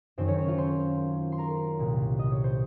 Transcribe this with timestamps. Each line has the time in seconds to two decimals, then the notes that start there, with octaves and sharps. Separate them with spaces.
0.18 F#2 D#3 C4 C5
0.28 C#4 C#5
0.38 C#4 C#5
0.48 F4 F5
0.58 C5 C6
1.32 C6
1.38 A#4 A#5
1.79 C2 A#2
2.19 D#5
2.31 C#5
2.44 C5